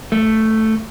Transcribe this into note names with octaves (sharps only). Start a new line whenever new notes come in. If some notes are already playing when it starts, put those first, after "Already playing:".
A3